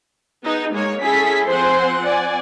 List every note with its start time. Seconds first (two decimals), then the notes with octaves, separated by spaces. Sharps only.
0.44 B3 D#4 G#4
0.73 G#3 A#3 C#5
1.03 C#4 E4 G#4 A4 B6
1.49 F3 C4 C5 F#5 G#5 C6
2.05 D5 G#5